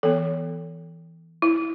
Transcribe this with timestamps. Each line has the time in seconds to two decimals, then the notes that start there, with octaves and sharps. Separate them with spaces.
0.03 E3 B3 A4
1.42 E4